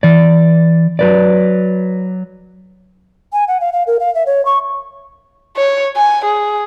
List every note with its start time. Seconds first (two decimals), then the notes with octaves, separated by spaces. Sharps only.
0.03 E3 D5
0.99 F#3 B4 D5
3.33 G#5
3.48 F#5
3.61 F5
3.73 F5
3.87 A#4
4.00 F5
4.15 E5
4.26 C#5
4.45 C#6
5.56 C#5
5.96 G#5
6.25 G#4